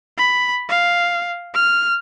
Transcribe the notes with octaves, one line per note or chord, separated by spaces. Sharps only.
B5
F5
F6